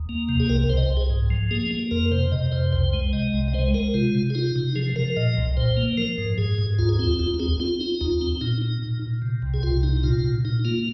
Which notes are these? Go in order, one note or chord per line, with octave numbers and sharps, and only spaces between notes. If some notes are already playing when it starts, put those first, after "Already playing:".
Already playing: D#2
A#3
C3
G#4
C2 A#4
C2 C5
D#5
C5
C2
G#4
G#2
F3
A#3 G#4
A#3
F2 A#4
C3 C5
C3 D#5
F2 C5
C2 C5
G#3
C3 D#5
C2
D#5
G#3 C5
G#3 A#4
C3 F4
C3
G#4
D#4 F4
C3
F3 G#4
F3 A#4
A#2 D#5
C2
A#2 C5
A#3
F3 A#4
G#2
G#2 G#4
G#2
D#2 F4
G#4
C4 F4
D#2 F4
F4
C4 G#4
C4 F4
D#4 F4
D#2 F4
C4
A#2 D#4
D#4
A#2
A#2
C3
C2
G#4
C2 F4
C3 D#4
D#4
A#2 F4
A#2
A#2 D#4
A#3 F4